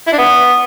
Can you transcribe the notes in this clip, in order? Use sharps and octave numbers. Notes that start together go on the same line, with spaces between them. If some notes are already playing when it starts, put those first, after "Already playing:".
E4
D4
B3